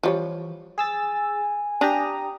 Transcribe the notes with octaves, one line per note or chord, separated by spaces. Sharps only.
E3 F3 G3 C#5
G#4 G#5 E6 A6
D4 G4 A#5 D#6